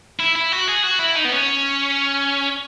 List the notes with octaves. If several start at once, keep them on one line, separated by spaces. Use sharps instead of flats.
E4
E4
F#4
G#4
F#4
E4
D#4
B3
C#4